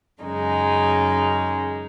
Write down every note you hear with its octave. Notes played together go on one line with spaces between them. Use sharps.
F#2 C#3 G#3 D#4